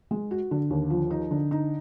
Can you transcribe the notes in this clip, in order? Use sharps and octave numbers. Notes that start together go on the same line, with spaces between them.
G#3
F#4
D3
D#2
F3
D#4
D3
D#4